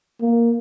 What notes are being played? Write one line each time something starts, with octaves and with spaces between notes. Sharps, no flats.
A#3